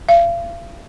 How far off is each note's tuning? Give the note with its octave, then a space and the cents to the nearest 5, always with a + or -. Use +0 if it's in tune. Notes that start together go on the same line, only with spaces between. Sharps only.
F5 -40